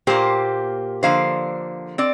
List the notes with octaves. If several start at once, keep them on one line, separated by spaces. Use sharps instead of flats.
A#2 A#3 G4 C5
D3 F3 A#3 C5 F5
C4 D5